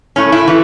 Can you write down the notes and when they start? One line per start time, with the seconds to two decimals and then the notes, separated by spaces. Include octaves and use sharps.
0.16 A2 A3 C#4
0.32 E4
0.47 E3 A3